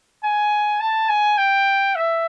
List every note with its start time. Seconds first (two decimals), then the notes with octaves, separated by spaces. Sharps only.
0.23 G#5
0.80 A5
1.09 G#5
1.37 G5
1.95 E5